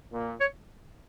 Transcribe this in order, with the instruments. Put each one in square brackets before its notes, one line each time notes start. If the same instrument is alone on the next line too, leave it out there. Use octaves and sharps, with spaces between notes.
[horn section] A#2
[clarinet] C#5